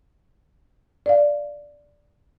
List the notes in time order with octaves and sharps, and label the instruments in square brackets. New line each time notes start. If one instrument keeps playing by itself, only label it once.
[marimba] D5 F5